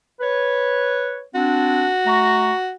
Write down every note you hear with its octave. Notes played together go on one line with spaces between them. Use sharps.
B4 C#5
C4 D4 F#4
A3 A#5 C#6